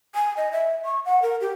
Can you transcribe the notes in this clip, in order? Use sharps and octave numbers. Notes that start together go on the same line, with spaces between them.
G#5
D#5
E5
C#6
F#5
A#4
G4